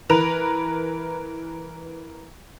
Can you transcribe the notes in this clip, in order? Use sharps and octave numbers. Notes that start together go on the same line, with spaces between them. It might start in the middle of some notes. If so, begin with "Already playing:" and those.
E3 A#4 B4 F7